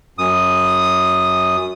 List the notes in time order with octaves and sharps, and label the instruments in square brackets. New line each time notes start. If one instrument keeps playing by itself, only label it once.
[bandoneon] F#2 D#6